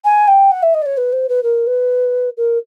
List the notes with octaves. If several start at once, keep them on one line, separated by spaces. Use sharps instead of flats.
G#5
G5
F#5
E5
D#5
D5
C#5
B4
C5
B4
A#4
B4
A#4